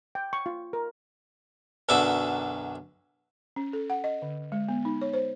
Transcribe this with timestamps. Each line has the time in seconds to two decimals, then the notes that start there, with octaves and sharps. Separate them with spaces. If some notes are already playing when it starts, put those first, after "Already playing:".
0.15 G5
0.33 C#6
0.46 F4
0.73 A#4
1.89 B1 F#2 D3 B4 E5 D6
3.56 C#4
3.73 A4
3.90 F#5
4.04 D#5
4.22 D3
4.52 G#3
4.68 B3
4.85 D#4
5.02 C#5
5.13 C5